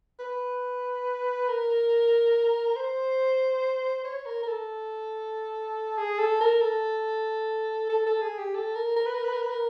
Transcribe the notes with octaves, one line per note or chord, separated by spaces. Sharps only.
B4
A#4
C5
C#5
A#4
A#4
A4
G#4
A4
A#4
A4
A4
A4
G#4
G4
A4
A#4
A#4
B4
A#4
B4
A#4
B4
A#4